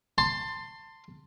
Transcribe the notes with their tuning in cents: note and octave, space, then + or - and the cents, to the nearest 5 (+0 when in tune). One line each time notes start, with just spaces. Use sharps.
A5 +25 C6 +0